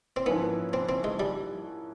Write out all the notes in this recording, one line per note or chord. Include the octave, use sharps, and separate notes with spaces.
C4
G#2 F3 A#3 B3 C#4 E4
C4
C4
G#3
G3